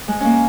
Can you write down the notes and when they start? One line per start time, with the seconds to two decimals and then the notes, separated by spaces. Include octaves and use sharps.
0.08 G#3
0.20 A#3 C#4